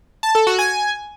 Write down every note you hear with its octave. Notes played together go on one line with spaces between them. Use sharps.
A5
A4
F#4
G#5